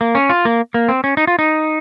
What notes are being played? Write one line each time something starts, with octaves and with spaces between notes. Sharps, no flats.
A#3
C#4
F4
A#3
A#3
C4
C#4
D#4
F4
D#4